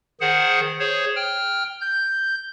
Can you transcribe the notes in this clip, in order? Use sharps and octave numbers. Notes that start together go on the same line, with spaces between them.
D#3 G#4 C5 F#5
G#4 C5 C#5
G5 F6
G6